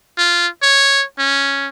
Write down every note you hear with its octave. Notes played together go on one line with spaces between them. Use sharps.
F4
C#5
C#4